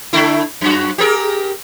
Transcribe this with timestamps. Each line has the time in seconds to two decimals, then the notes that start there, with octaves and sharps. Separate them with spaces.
0.13 D3 A3 E4
0.61 F#2 F#4
0.98 G4 G#4 A#4